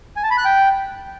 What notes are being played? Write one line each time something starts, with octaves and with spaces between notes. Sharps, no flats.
G#5
A5
B5
F#6
G5